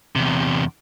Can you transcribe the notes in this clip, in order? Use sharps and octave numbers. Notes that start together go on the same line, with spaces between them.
E2 C3